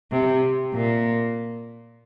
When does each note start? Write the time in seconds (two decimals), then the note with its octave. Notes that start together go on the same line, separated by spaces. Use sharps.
0.12 C3
0.73 A#2